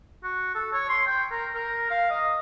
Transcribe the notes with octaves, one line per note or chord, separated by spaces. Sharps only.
F#4
A4
C#5
C6
G5
A#4
A#4
F5
D#5